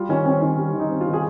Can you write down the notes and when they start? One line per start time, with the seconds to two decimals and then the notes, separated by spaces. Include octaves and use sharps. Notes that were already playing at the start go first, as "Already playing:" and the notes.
Already playing: G3 F4
0.09 D#3 C#4
0.25 C4 C#4
0.41 D#3 C#4
0.58 G3
0.74 D#3
0.80 D#4
0.90 C4
1.01 F4
1.07 D#3
1.13 G#4